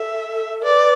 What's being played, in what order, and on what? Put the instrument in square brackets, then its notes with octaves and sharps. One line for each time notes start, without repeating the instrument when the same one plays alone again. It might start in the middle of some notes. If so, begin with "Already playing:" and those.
Already playing: [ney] A4 [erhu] E5
[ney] B4 [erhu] D5